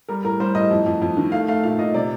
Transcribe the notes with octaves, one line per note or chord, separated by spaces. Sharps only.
G3 A#4
A2 A#4
G3 C5
A2 D#5
F2
F2
F2
D#3
A3 F5
A3 F5
A#2 F5
A#2 D#5
C3 D5